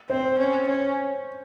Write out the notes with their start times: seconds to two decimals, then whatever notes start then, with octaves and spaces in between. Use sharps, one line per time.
0.10 C4 C5
0.39 C#4
0.67 C#4 C#5